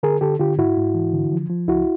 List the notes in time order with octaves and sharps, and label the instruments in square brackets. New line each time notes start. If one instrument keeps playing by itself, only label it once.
[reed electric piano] D3 G#4 A#4
D3 G4 A4
D3 F4 G4
G#2 E4 F#4
G#2
E3
D3
F3
F3
C#2 E4 F#4